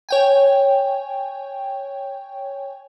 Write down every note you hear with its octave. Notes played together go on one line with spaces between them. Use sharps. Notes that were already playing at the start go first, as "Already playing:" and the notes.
C#5 G5 G#5